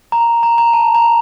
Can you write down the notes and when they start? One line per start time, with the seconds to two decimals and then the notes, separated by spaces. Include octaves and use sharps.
0.12 A#5
0.43 A#5
0.58 A#5
0.73 A5
0.95 A#5